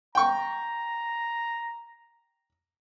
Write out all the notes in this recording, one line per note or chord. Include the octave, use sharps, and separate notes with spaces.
G5 A#5 C#6